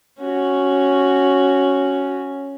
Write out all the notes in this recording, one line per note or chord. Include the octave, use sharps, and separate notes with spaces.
C#4 F#4